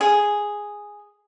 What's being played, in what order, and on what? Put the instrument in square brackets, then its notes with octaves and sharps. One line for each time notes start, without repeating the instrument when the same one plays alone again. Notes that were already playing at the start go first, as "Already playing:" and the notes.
[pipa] G#4